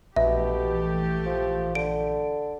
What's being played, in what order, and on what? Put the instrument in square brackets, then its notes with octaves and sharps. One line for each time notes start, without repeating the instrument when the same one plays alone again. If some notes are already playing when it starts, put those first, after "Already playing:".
[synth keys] A#1 [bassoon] B2 [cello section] E3 A3 G4 [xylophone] E5
[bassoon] F3
[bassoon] D3 [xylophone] D7